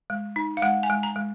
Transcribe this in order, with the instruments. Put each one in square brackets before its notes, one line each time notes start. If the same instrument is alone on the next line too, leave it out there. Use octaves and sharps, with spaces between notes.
[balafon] G#3
D#4
F5
G#3 F#5
G#5
G#3
A#5
G#3